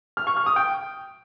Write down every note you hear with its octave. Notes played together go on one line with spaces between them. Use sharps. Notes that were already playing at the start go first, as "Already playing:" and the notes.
F6
C#6
F6
D#6
G5